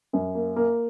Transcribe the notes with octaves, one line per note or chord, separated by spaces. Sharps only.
F#2
A#3
A#3